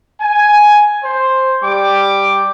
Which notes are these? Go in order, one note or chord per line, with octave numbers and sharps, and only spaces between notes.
G#5
C5
G3 G5 D6